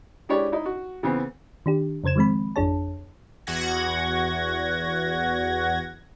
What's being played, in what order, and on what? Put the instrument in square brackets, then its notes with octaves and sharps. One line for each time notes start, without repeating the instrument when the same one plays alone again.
[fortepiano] G#3 D4 E4 G4 C#5 D5
D#4 E4
F#4
C#3 E3 B3 C4
[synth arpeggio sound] D#3 D4 G4
F2 C#3 C5 G#6 E7
D#3 F3 G#3 C4 B5
G#1 F2 D4 G#4 C#5 A5
[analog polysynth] E2 F#4 F#5 G#6 A#6